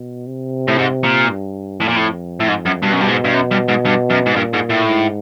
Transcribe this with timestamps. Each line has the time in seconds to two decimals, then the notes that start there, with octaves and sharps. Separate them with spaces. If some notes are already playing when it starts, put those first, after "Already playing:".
Already playing: B2
0.27 C3
0.68 A2
0.78 G#2
1.04 A#2
1.29 G2
1.81 F2 A2
1.88 A#2
1.96 A2
2.40 A2
2.48 G#2
2.66 F#2
2.82 G2 B2
2.93 F#2
3.01 G2
3.08 G#2
3.24 G2
3.34 F#2
3.51 G2
3.68 G#2
3.85 G2
4.10 F#2
4.26 G#2
4.36 G2 A#2
4.53 G#2
4.70 A2
4.87 G#2